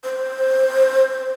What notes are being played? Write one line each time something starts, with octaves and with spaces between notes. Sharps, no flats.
C5